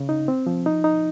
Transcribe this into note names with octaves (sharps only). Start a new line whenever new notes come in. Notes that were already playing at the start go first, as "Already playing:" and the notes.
Already playing: C#3
D#4
C4
F3
D#4
D#4